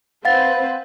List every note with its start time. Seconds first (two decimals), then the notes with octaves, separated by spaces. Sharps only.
0.25 C4 B4 C5 F5 F#5 A6